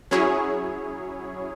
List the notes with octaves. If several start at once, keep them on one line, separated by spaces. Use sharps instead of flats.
F#3 C#4 E4 G#4 C#5